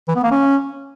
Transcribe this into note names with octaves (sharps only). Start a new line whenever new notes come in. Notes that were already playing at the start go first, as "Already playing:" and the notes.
E3
B3
A#3
C#4